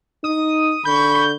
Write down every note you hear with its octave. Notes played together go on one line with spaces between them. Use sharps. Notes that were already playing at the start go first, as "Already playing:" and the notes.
D#4 D#6
D3 B5 C#6 G6